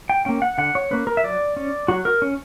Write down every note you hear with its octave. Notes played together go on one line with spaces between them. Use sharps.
G5
A#3 C#4 G5
F#5
D3 F#5
C#5
A#3 C#4 B4
A#4
E5
F#3 D5
C#4
F#3 F#4
A#4
C#4